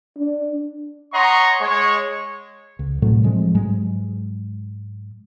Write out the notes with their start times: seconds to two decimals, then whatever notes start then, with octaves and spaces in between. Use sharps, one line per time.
0.18 D4
1.13 C#5 D#5 F#5 A#5 C6 C#6
1.60 G#3 C#5
2.79 C#2
3.02 A2 C3 F#3 A3
3.23 F3 G#3 C4
3.54 G#2 F#3 G#3